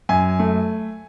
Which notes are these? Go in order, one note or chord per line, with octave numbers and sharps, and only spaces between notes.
F#2 G#5
A3